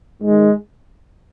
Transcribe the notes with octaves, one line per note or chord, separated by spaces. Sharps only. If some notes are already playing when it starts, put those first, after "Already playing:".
G#2 D#3 G#3